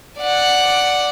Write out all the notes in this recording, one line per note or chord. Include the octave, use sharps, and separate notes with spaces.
D5 F#5